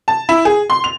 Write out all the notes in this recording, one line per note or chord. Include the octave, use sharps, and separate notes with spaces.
A5
E4
G#4
C6
F7